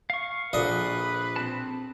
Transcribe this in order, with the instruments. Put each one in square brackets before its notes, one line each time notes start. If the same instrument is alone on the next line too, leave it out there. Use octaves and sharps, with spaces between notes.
[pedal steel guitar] F5 C#6
[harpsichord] A#1 D#5 [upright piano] F#4 A4 D5 [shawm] B4
[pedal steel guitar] C4 A5